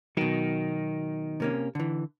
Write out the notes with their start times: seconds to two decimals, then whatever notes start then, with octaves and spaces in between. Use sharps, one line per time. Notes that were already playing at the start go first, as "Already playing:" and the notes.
0.17 B2 D#3 F#3
1.40 C3 A#3 C#4
1.75 D3 E3